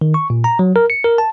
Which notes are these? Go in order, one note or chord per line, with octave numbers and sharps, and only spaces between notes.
D#3
C#6
A#2
A#5
F#3
A#4
C#7
A#4
A5